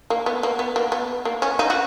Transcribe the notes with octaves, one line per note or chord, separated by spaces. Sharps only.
A#3
B3
A#3
B3
A#3
B3
A#3
C#4
D#4
F#4